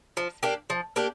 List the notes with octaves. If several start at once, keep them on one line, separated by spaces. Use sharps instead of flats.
F3
A#3 D4 G4
F3
A#3 D4 G4